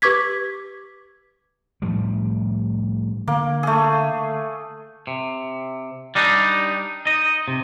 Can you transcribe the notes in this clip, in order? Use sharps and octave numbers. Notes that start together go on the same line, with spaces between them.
G4 B4 C#6 D6 G#6 B6
A2 F3 G3
D3 A#3
A3 G#4
C3
G3 D4 D#4
D#4 D#5
C3